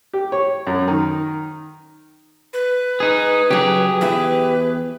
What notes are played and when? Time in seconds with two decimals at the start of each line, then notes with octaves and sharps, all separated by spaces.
0.13 G4
0.32 C#5
0.67 F#2
0.88 D#3
2.53 B4
3.00 D#4 G#4
3.51 C#3 F#3 G4 G#4
4.01 E2 E4 B4